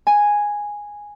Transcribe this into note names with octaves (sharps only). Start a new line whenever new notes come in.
G#5